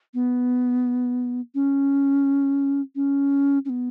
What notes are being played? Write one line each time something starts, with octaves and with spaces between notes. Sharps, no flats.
B3
C#4
C#4
C#4
B3